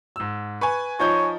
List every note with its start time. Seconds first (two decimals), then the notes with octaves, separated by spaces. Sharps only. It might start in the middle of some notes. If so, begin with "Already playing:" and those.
0.16 G#2 E6
0.61 B4 G#5 C#6
1.00 F3 D#4 C#5 G6